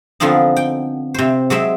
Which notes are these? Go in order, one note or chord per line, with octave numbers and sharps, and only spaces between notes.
D3 F3 B3 C4 D#4
G5
C3 C5
F#3 G#3 C4 E5